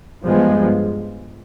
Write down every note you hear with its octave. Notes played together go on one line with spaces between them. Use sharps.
G2 F3 G#3 B3